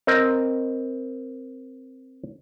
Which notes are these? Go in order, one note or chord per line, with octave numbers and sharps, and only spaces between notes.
C4 A#4 D#5